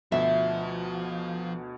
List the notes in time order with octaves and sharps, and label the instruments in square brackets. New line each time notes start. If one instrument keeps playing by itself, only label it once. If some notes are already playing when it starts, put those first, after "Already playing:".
[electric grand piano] D2 B2 [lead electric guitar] F3 [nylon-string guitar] E5